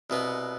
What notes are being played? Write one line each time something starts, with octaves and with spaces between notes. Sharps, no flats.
C2 B2 B3